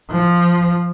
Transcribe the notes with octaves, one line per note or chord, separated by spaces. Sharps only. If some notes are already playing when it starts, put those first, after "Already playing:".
F3